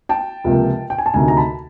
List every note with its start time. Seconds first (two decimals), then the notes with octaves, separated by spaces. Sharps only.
0.09 G5 A5
0.44 C#2 C3 F3 A#3
0.90 G5
0.98 G#5
1.06 A5
1.14 D2 C3 D#3 G#5 A#5
1.28 A#5
1.37 A5 B5